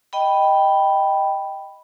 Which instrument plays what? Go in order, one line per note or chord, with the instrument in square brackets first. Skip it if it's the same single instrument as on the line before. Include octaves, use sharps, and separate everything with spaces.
[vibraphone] D#5 G5 B5